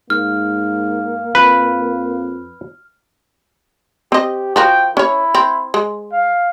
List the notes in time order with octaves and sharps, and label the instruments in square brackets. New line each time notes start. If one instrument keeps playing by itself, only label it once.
[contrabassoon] G#2 [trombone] A#3 [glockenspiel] F6
[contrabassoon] F2 [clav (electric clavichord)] B4
[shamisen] C4 D#5 [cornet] G4
[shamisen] F3 F#4 A#4 [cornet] G5
[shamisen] C#4 C#5 [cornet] E4
[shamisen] C4
G#3
[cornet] F5